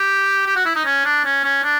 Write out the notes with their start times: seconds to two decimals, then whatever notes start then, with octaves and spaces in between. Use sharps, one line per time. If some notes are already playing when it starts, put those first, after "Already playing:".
Already playing: G4
0.46 G4
0.56 F#4
0.66 E4
0.76 D#4
0.85 C#4
1.05 D4
1.25 C#4
1.44 C#4
1.64 D4